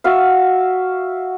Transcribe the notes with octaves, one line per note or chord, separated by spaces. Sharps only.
F#4 E5 F5